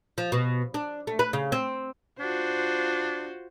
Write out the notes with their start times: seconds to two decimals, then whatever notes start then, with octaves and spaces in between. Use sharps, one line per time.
0.18 F3
0.32 B2
0.74 D4
1.07 A3
1.19 B4
1.33 C#3
1.52 C4
2.20 D4 F4 F#4 C5